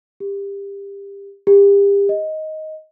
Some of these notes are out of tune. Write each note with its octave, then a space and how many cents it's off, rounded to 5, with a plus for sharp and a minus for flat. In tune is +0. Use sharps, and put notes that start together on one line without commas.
G4 +25
G4 +35
D#5 +10